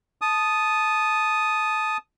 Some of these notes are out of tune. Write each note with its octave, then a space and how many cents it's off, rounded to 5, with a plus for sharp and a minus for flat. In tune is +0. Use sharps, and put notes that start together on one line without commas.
A5 -15 D#6 +0